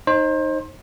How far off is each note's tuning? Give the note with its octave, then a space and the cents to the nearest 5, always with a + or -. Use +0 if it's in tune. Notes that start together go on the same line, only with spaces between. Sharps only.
D#4 -5 C5 +30